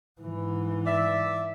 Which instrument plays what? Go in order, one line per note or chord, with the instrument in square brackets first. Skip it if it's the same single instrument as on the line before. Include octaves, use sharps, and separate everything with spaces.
[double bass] G#2 E3
[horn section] D5 E5